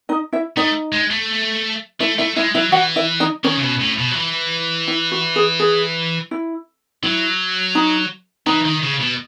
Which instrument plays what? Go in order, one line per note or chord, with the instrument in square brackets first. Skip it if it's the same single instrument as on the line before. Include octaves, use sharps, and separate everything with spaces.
[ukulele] D#4 D#5
E4 E5
[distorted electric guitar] A3 [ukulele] D#4 D#5
[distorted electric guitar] G#3
A3
[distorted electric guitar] A3 [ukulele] E4 E5
[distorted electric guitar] A3 [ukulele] E4 E5
[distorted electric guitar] G#3 [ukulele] E4 E5
[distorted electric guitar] F#3 [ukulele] E4 E5
[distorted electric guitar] E3 [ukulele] F#4 F#5
[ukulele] E4 E5
D#4 D#5
[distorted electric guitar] D#3 [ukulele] C#4 C#5
[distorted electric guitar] C#3
B2
A2
B2
F#3
E3
[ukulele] E4
F#4
G#4
G#4
E4
[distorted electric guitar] F#3 [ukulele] E4
[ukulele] D#4
[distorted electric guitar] E3 [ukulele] D#4
[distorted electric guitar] D#3
C#3
B2